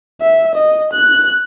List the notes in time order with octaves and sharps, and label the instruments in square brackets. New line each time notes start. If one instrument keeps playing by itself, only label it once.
[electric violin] E5
D#5
F#6